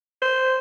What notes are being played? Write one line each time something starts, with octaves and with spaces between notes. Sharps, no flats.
C5